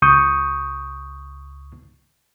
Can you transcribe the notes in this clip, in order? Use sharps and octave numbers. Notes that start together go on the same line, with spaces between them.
C#2 C#6 D#6 G6